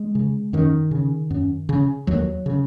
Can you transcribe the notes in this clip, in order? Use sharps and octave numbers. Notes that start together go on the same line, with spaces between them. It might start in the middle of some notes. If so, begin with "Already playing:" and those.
Already playing: G#3
C#3
F#2 D#3
C#3
F#2
C#3
D#2 F#3
C#3